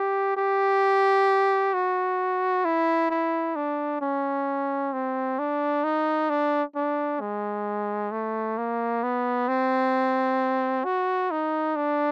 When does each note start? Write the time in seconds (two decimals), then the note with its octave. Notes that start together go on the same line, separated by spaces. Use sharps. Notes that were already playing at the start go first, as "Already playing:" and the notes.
Already playing: G4
0.37 G4
1.74 F#4
2.65 E4
3.10 E4
3.56 D4
4.01 C#4
4.93 C4
5.39 D4
5.84 D#4
6.30 D4
6.75 D4
7.21 G#3
8.12 A3
8.58 A#3
9.03 B3
9.48 C4
10.85 F#4
11.31 D#4
11.76 D4